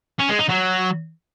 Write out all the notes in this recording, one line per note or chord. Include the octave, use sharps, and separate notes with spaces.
C#4
G#3
D#4
F#3